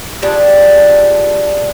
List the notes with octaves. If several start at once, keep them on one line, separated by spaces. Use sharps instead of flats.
F3 G3 D4 G#4